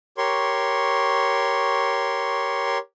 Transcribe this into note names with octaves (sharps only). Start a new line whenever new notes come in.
G4 A#4 C#5 C6 C#6